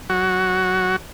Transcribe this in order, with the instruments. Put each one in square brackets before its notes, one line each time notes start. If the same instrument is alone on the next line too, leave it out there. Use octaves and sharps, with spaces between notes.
[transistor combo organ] F#3 F#4